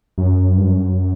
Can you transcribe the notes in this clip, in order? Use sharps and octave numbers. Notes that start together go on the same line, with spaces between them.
F#2
G2
F#2